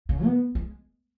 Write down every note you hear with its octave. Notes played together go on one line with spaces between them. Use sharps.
C#3
B3
G#3